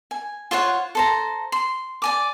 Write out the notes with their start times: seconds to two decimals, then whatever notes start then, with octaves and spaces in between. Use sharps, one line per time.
0.11 G#5
0.51 F4 C5 C#5 F#5
0.95 A4 C5 A#5
1.52 C6
2.02 D5 G#5 D6